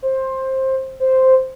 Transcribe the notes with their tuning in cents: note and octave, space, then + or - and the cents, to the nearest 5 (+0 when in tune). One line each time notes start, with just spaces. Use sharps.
C5 +15
C5 -5